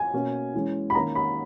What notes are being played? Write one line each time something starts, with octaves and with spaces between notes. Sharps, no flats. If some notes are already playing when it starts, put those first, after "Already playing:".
Already playing: G#5
B2 A#3 C#4
E3 G#3 C#4
B5
D#3 A#3 C#4 A#5
B5